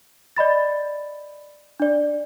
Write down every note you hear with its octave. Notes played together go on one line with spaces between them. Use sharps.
D5 D#5 B5 A6
D4 D5